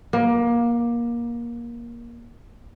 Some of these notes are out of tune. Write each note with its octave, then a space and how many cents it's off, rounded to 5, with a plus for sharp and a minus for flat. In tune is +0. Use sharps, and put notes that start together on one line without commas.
A#3 +20